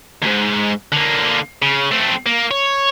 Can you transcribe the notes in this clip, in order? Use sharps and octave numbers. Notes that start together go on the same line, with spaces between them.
D#2 G#2
D3 A#3
C#3
A3 C4
A#3
C#5